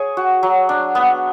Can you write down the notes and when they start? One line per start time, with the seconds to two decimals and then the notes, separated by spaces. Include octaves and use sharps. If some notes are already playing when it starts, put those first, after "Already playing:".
Already playing: G#4 C#5
0.17 F#4
0.43 F#3
0.69 D4
0.95 B3